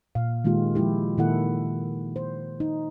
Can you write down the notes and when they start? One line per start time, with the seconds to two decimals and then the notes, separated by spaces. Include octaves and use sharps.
0.15 A#2 F5
0.44 D#3 G#3 A#3 F4 G4
0.75 F3 G#3 E4 G4
1.17 A#2 D#3 A#3 E4 A4 F#5
2.16 C5
2.60 D#4